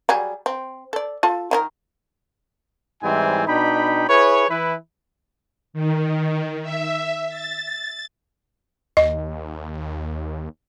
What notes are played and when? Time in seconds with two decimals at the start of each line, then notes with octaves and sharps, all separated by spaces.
0.09 F#3 G3 G#4
0.46 C4
0.93 A4 D5
1.23 F4 A4 A5
1.51 D#3 D#4 A#4
3.03 G#2 E3 G3 C4 E4 G#5
3.47 B2 D4 D#4 G5 B5
4.09 E4 G#4 B4 C#5
4.49 E3 E4 B4
5.73 D#3
6.63 E5
7.29 A6
8.97 D#2 D#5